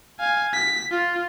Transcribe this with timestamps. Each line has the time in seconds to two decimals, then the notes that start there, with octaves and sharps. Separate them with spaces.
0.20 F5 G#5
0.54 B6
0.92 F4